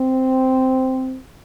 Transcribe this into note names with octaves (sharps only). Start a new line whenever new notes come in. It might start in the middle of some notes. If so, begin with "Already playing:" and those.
Already playing: C4